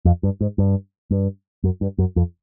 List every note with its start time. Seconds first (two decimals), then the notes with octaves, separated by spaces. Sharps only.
0.05 F2
0.23 G2
0.41 G#2
0.58 G2
1.11 G2
1.64 F#2
1.81 G2
1.98 F#2
2.16 F2